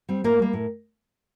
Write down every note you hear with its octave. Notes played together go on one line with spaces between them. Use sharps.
G3 C4
A2 A#3 A#4
G3 A#3
A2